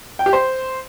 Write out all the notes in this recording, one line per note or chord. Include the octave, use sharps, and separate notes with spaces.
G5
G4
C5